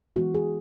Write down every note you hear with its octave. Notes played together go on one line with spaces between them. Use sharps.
E3 G#3 B3 F#4
G#4